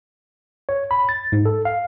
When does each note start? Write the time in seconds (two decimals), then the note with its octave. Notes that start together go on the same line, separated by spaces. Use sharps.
0.69 C#5
0.91 B5
1.09 A6
1.32 G#2
1.46 A4
1.65 F5